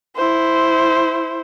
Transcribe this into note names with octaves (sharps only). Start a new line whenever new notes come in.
E4 C5